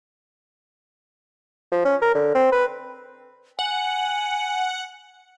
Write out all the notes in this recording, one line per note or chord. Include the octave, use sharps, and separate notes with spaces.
F3
C#4
A#4
D3
C4
B4
F#5 G#5